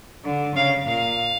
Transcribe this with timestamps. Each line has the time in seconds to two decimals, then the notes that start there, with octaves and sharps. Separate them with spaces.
0.25 D3
0.55 C#3 F5
0.86 A#2 F5